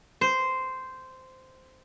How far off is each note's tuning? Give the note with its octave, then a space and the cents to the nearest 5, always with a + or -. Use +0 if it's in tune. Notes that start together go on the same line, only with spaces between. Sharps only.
C5 -10